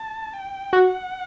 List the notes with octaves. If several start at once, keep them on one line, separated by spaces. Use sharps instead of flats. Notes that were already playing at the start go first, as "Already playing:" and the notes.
Already playing: A5
G5
F#4 F#5